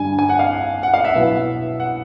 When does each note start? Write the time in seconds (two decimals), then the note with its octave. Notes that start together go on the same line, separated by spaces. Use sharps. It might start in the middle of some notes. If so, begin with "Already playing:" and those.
Already playing: G2 D3 G3 G#5
0.19 G#5
0.29 F#5
0.39 F5
0.83 F#5
0.94 F5
1.05 E5
1.15 B2 F#3 B3 E4
1.80 F#5